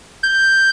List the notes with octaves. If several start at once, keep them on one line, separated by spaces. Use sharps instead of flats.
G6